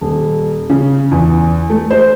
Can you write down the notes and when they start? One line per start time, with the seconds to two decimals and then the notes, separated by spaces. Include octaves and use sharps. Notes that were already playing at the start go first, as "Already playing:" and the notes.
0.01 D#1
0.70 C#3
1.11 E2
1.69 A3
1.91 C5